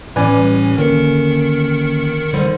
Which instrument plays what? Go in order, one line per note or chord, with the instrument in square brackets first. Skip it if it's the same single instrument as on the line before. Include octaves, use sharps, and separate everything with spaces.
[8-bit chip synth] A2 E3 C#4 [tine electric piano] B4 D5 G#5
[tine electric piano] G3
[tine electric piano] D3 A#3 C#4 [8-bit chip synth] D#3 A#4 C#7
[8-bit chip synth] D3 G3 [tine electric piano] D#3 C5